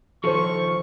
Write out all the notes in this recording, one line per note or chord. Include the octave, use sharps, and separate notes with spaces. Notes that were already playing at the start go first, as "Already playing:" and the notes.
D#3 F3 A4 C5 C#6